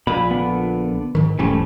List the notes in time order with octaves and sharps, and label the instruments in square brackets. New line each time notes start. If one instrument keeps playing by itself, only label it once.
[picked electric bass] A#1 A#2 [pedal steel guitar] B5
[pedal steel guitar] D3 B3
[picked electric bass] G#2 D#3
[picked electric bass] E1 G#2 C#4 [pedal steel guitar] E3 G3 A3